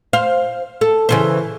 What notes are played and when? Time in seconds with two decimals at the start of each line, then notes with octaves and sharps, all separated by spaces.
0.13 C5 F5
0.81 A4
1.09 C#3 E3 C5